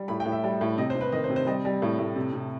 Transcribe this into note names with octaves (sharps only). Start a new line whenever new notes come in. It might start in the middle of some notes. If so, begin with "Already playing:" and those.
Already playing: G3
A2 B5
G5
A2
E5
G3
A2
C3 D#5
C5
C3
B4
D#3 D#5
C5
C3
C5
G3 D#5
G3
A2
A2
C3
C3